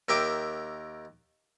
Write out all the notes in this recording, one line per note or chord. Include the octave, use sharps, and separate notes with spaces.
D#2 A#4 E5 G5 D6